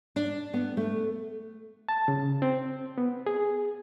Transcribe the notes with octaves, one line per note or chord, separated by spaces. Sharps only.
D4
B3
A3
A5
C#3
C4
B3
G#4